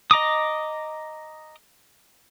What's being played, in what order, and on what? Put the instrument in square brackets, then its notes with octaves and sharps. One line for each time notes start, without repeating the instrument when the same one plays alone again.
[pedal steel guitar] D#5 A#5 D6 D#6